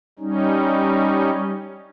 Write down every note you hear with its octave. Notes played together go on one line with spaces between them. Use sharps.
G3 C#4 D#4